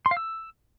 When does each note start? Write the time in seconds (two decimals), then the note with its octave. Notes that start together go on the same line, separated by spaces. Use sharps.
0.06 C6
0.11 F5
0.17 E6